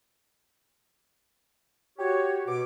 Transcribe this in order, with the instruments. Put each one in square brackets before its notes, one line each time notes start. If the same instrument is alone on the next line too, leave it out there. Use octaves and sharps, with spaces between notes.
[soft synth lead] F#4 [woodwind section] G4 C#5
[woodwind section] B2 D6